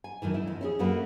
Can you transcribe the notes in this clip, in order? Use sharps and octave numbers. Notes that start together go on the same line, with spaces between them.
G#5
F#2 A2 D#3 E3
E4 E5
F2
C#4 E4 G#4
F#2 A3 A#3 F#4 B4